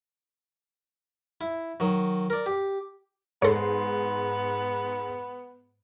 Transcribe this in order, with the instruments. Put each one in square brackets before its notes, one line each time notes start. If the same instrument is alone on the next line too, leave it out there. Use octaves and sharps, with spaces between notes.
[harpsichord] E4
D#3 F#3
A#4 D5
G4
[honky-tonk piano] G#2 C6 [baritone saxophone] B3 [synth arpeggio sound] A4 C#5